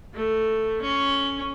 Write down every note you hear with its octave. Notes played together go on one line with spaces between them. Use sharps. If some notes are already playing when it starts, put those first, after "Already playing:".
A3
C#4